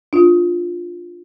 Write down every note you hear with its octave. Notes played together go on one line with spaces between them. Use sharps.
D4 F4